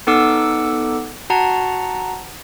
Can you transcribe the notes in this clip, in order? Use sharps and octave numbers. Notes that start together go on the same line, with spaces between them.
B3 D#4 A4 F#5 D6 E6
F#4 F#5 A5 A#5